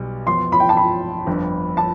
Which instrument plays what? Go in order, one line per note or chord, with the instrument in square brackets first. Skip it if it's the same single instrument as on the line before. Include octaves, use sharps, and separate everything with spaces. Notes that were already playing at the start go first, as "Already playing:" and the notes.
Already playing: [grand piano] B1 B2 G3
[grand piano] F2 E3 B3 [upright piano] C6
[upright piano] B5
G5
A5
B5
[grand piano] G1 F2 D3
[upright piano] A5